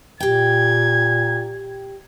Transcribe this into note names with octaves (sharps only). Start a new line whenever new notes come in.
A#2 G4 G5 G#6